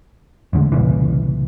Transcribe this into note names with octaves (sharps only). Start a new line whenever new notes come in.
A1 E2 D3 G#3
C2 A#2 C#3 E3